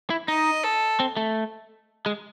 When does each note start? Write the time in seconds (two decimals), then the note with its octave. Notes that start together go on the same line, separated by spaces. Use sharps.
0.10 E4
0.28 D#4 D#5
0.64 A4
1.00 C4
1.17 A3
2.06 G#3